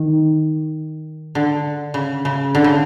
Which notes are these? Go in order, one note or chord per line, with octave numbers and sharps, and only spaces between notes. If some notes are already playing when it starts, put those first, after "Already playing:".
Already playing: D#3
D3
C#3
C#3
D3
C#3